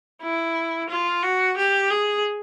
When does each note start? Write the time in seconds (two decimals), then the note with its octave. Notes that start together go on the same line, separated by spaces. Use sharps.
0.22 E4
0.89 F4
1.23 F#4
1.57 G4
1.90 G#4